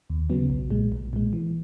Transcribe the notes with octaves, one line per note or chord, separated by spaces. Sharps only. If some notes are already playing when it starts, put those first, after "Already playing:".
D#2
C#3 F#3 B3
B1
A#2 G#3
B1
A#2 G#3
E3